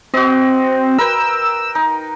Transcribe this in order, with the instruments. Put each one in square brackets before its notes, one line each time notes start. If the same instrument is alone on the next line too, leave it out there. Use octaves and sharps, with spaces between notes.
[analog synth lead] C4 [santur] F#4 D#5
[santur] A#4 B4 G5 [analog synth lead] E6
[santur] D#4